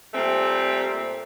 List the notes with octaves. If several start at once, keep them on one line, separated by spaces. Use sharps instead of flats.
A#2 G3 A3 C4